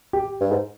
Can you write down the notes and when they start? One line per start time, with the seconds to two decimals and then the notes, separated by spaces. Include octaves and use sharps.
0.13 G4
0.41 G2
0.52 G#2